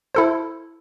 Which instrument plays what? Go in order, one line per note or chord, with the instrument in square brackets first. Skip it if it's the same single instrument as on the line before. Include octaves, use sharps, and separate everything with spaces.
[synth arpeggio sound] E4 A4 C5